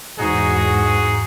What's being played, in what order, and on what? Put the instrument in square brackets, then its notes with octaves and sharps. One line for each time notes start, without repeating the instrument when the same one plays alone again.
[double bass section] E2 G#2 [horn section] D#4 F#4 G#4